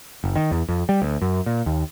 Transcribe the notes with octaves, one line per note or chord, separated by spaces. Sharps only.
F#1
D#3
E2
F2
G3
D2
F#2
A#2
D#2